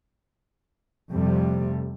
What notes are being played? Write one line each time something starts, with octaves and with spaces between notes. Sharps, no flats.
F2 C3 G3 A3